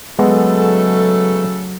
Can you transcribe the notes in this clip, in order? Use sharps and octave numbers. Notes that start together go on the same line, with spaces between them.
C#3 F#3 G#3 A3 B3 A4